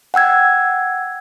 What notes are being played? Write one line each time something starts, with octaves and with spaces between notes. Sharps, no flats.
F#5 G5 E6 G#6